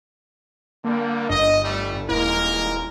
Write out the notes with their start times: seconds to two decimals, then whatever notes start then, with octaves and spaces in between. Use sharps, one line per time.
0.84 D3 G3 A#3
1.29 G1 G2 D#5
1.63 E3 G3 A3
2.09 D#1 G#3 A#3 E4 A#4